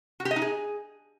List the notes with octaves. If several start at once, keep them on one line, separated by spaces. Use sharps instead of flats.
F#4
G4
D#5
D#4
G#4